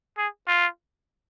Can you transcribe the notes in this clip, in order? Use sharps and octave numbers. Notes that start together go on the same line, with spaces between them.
G#4
F4